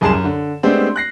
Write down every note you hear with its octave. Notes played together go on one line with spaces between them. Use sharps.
C2 F#2 G#4 A5 C6 E7
F#2
D3
G#3 A3 B3 C4 D4 G4
F#6 A#6 C7